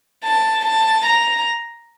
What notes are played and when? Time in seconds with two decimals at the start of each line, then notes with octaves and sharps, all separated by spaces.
0.24 A5
0.65 A5
1.06 A#5